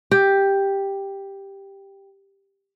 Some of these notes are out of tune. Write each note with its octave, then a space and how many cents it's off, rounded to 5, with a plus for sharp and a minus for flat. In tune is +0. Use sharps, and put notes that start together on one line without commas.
G4 +5